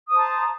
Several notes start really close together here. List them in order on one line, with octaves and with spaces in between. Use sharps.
D#6 C5 A5 A#5